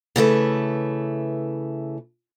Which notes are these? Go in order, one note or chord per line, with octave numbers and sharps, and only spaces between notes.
C#3 E3 A3 B4